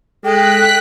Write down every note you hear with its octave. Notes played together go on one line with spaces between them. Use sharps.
G#3 A4 G5 F#6 B6